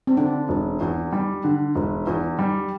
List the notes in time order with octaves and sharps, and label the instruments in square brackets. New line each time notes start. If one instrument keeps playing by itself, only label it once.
[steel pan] C4
[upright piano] D3 [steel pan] D4
[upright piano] E1
E2
G3
D3
E1
E2
G3